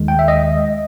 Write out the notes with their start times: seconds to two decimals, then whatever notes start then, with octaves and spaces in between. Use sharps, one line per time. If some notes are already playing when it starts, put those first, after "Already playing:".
Already playing: D#2 D#3 G#3
0.08 G5
0.19 E5
0.28 D#5